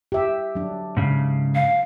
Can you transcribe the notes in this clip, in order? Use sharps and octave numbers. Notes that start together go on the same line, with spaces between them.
G4 E5
F#3 D4
G#2 C#3
F5